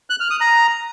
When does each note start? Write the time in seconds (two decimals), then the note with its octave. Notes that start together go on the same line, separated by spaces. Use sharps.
0.10 F#6
0.20 F6
0.30 D#6
0.41 A#5